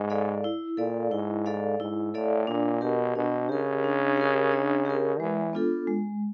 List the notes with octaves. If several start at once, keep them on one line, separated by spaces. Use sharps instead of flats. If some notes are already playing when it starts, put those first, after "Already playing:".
Already playing: G#2
A4 D5 F5
E4
A#2 A4 D5 F5
G#2 E4
A4 D5 F5
G#2 E4
A2 A4 D5 F5
A#2 D4
B2 G4 A#4
B2 D4
C#3 G4 A#4
D4
G4 A#4
D4
G4 A#4
E3 G#3
B3 D4 F4 A4
G#3